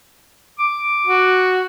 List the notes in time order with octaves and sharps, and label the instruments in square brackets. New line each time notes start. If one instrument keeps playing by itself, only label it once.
[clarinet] D6
[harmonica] F#4